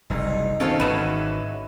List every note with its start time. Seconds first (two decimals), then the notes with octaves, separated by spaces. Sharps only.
0.10 F#1 C2 D#4
0.60 B2 D#3 C4 C#4 F4 A4 F5
0.80 G#1 D#3 E3 F#3 C#4 B4 E7